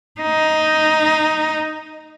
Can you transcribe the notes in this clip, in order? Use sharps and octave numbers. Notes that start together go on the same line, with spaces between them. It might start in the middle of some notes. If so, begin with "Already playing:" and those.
D#4